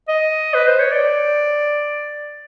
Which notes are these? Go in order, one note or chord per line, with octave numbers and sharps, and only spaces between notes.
D#5
B4
C5
C#5
D5